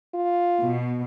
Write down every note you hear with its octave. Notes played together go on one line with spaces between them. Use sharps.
F4
B2